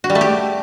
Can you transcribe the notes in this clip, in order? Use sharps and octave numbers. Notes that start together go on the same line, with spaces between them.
F#4
G3
A3
G4